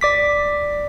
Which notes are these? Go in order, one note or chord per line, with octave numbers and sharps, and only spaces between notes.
D5 D6 B6